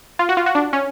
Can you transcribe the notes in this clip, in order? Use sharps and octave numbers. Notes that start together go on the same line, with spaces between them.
F4
F#4
F4
F#4
D4
C#4